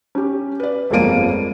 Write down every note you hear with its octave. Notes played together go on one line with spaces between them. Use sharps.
C#4 G4
B4 D5
G1 F2 G#3 A#3 D7 D#7